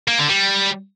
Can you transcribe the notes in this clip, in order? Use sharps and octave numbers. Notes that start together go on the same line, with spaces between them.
A#3
D3
G3